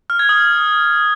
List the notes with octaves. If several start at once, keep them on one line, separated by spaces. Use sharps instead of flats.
F6
G#6
D#6